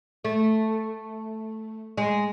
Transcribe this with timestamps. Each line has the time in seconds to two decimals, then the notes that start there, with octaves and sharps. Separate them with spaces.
0.25 A3
1.98 G#3